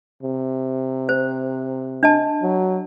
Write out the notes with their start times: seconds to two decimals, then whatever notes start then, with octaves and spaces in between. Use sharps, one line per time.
0.23 C3
1.09 C5
2.03 D4 D#5 A5
2.42 F#3